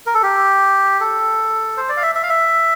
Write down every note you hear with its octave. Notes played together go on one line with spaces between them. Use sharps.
A#4
A4
G4
A4
C5
D5
F5
E5
E5
F5
E5